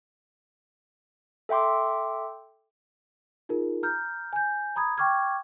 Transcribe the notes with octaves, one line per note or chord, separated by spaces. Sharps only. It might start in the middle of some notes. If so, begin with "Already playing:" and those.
A4 E5 G5 C6 D6
D#4 F4 G#4 A#4
A#5 F6 G6
G#5 G6
A#5 B5 D#6 G#6
G5 C#6 D6 F6 G#6